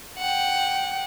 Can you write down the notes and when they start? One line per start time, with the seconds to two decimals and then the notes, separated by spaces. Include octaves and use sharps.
0.18 F#5 G5